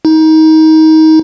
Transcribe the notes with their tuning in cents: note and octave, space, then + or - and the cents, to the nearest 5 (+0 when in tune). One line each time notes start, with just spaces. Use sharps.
D#4 +25